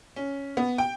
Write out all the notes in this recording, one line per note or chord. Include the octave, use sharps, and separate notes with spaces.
C#4
B3
G5